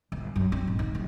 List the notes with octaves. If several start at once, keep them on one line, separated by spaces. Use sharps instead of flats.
G1
F#2
C4
G#2
D#3
F#1